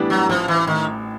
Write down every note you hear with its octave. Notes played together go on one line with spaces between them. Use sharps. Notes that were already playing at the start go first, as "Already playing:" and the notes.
Already playing: A2 E3 G3 B3 D4
F#3
A1 F3
E3
A2 D#3